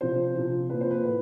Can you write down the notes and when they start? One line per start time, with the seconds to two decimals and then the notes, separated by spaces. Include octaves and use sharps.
0.01 C3 F3 C5
0.35 C3 F3
0.70 A#2 F3 B4
0.81 C5
0.91 B4
1.04 A2